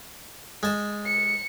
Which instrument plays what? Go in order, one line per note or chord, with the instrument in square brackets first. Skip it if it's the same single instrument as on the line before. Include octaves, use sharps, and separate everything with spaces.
[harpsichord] G#3 A5
[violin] C#7